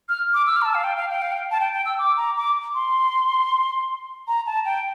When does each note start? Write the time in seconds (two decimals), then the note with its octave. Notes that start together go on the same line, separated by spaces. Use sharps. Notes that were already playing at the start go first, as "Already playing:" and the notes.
0.09 F6
0.34 D6
0.46 E6
0.56 F6
0.61 A#5
0.65 A5
0.75 F5
0.84 G5
0.97 F5
1.10 G5
1.22 F5
1.32 G5
1.51 A5
1.60 G5
1.73 G5
1.86 E6
1.99 D6
2.17 A#5
2.37 D6
2.74 C6
4.28 A#5
4.46 A5
4.65 G5